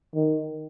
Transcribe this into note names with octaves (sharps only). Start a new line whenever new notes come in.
D#3